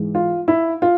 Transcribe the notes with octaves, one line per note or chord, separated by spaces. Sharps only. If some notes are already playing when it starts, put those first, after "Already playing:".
Already playing: G#2 E3 G#3
F4
E4
F4